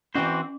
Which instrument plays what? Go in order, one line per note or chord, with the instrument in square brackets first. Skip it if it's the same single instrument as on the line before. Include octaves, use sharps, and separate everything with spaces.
[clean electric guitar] E3 C4 F#4 C5 [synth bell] C#4